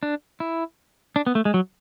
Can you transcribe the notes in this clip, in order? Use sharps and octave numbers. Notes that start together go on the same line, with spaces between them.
D4
E4
D4
B3
A3
G#3
F#3